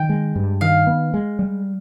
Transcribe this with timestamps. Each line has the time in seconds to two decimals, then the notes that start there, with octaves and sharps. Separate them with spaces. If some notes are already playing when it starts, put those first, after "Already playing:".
Already playing: D#3 G5
0.09 G#3
0.36 G2
0.61 D#3 F5
0.87 B3
1.14 G#3
1.39 G3